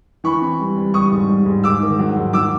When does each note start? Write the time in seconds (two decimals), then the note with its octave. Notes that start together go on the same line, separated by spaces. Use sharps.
0.24 E3 B5 C#6
0.41 C4
0.59 G3
0.77 G3
0.94 G3 C#6 D#6
1.12 G#2
1.29 G3
1.46 G#2
1.64 G#2 D6 E6
1.82 D#3
1.99 F#3
2.17 G#2
2.33 F#3 D6 E6